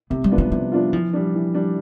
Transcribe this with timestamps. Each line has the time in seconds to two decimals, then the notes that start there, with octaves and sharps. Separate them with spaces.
0.10 C3 B3
0.24 G3
0.31 F3 B3 D4 F4
0.38 G3
0.51 C3 G3
0.72 F3 B3 D4 F4
0.93 E3 F3
1.13 G3 D4
1.35 E3
1.54 G3 D4